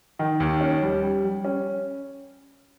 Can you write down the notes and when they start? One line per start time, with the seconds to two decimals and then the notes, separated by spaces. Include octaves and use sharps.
0.19 D#3
0.40 D#2
0.61 C#4
0.82 G3
1.02 G3
1.24 G3
1.45 C#4